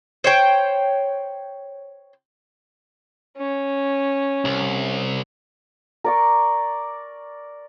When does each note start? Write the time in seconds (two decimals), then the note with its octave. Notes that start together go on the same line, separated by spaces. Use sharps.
0.24 C5 C#5 G5
3.37 C#4
4.45 C2
6.04 A#4 D5 C#6